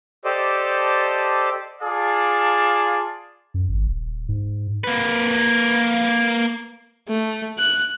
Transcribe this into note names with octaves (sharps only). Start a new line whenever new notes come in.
G4 A4 C5 D5 D#5 A5
F4 G#4 D5 F5 A5
F#2
G#1
D#1
G#2
A#3 B4
A3
F#6